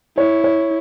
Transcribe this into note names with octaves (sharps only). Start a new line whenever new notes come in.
E4 C#5
C#5